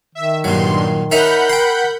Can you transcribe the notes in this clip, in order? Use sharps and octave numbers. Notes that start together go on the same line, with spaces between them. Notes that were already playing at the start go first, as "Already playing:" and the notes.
D#3 E5
G2 A#2 F#3 C6
C#4 D#4 A#4 E5 F#5 B5 G6
G5 C6